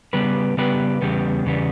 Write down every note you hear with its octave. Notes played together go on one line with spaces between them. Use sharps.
C#3 G3 B3 G4 B4
C#3 G3 B3 G4 B4
E2 C#3 G3 B3
E2 C#3 G3 B3